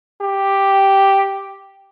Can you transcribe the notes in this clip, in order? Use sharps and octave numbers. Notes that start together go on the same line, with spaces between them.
G4